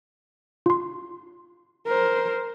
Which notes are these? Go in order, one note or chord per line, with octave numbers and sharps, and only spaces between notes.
F4 C6
A#4 C5